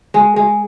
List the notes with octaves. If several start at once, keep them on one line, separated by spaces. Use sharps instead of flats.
G#3
G#3